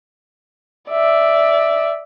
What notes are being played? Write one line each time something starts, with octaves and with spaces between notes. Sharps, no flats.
D5 E5